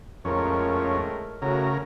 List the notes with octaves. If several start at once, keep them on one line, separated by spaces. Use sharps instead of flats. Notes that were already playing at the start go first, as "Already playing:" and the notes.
F2 A2 G#3 C#4 A#4
A2 C#3 F#4 A#4